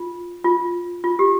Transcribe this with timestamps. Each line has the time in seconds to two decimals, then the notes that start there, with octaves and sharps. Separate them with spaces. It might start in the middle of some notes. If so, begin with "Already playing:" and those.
Already playing: F4
0.44 F4
1.04 F4
1.19 G4